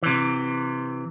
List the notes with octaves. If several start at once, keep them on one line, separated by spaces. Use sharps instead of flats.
C3 E3